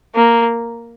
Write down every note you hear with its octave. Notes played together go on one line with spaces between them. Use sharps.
A#3